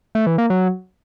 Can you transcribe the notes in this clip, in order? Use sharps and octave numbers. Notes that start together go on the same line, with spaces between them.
A3
E3
A#3
F#3